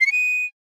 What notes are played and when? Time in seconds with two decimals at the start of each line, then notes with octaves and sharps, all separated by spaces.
0.01 C7
0.06 C#7
0.12 D#7